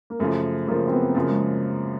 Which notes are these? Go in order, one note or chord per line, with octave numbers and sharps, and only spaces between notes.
A#3
F#2 C#3 F3 A3
F#2 C#3 F3 A#3
C4
B3
F#2 C#3 F3 A#3
G#3